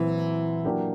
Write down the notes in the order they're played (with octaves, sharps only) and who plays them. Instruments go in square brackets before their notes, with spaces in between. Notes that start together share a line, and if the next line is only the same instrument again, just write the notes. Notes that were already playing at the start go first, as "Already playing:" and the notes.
Already playing: [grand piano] A#2 F#3 C4 E4 [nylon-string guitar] E3
[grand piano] F#3 A#3 D4 G4